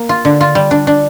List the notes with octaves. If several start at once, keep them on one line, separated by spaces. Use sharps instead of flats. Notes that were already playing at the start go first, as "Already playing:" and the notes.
Already playing: A#3
F4
D3
F4
G3
D4
D4